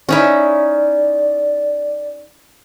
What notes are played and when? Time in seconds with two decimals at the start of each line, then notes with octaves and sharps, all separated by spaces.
0.09 C#4 D#4 E4 D5